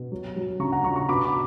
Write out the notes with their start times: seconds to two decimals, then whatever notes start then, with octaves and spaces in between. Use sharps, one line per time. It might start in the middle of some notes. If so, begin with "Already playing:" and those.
Already playing: B2
0.12 F#3
0.36 F#3
0.60 C#3 A#5 C#6
0.72 F#5 A#5
0.84 C#3 A#5 C#6
0.96 A#5 C#6
1.09 B2 B5 D6
1.25 B5 D6